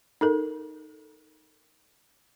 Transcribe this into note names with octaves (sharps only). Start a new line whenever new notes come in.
D#4 A4 A#4